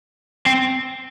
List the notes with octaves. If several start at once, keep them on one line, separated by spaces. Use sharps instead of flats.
C4